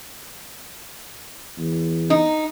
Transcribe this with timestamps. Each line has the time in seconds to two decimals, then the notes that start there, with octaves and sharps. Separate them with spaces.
1.58 E2
2.10 D#4